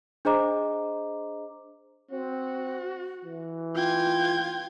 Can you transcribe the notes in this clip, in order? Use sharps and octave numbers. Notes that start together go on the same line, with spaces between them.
D4 G#4 C5 D#5 A#5 D6
C4 F#4
E3
F4 G5 G#6